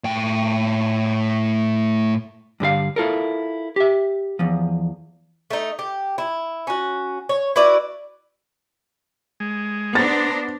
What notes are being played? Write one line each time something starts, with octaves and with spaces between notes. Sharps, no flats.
A2 G5
G2 D3 G4 F5
E4 F4 A4 A#4
G4 E5
E2 F3
A3 D#4
G4
E4
C#4 F#4
C#5
E4 F#4 B4 D5
G#3
B3 D4 C5 A#5 A6